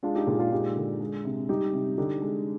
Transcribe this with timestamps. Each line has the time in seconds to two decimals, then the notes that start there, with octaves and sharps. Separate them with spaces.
0.03 G#3 D4 F4
0.15 D#4 G4
0.27 A#2 F4 G#4
0.39 F4 G#4
0.52 G#3 D#4 G4
0.76 D3
1.00 G#3
1.25 C3
1.49 G3 D#4 G4
1.73 C3
1.98 D3 D#4 G4
2.22 G#3